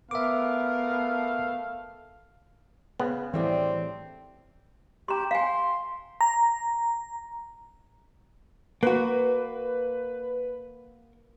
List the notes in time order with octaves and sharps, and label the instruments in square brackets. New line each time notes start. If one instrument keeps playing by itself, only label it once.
[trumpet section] A3 A4 F5 [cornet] B3 [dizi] A#4 [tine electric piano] E5 D6
[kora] C#3 [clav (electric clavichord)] B3
[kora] A2 G3 D4 [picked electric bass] E3 [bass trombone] C4
[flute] G4 [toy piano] A#5 C6
[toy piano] F5 G#5 [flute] C6
[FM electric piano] A#5
[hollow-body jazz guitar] A#3 F#4 [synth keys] B4